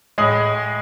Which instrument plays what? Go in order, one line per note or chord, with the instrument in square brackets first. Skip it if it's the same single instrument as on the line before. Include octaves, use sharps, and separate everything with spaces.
[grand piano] A2 G#3 G#4